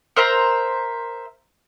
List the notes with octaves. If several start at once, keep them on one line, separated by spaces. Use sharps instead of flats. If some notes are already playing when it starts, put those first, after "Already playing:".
A#4 C5 E5 A#5